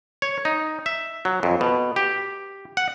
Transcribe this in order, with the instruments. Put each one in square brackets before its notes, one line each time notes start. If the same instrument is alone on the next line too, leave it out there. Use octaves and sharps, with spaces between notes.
[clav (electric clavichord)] C#5
D#4
E5
F#3
F2
B2
G4
F#5